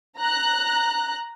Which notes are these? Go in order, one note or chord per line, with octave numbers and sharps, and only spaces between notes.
A#5 F#6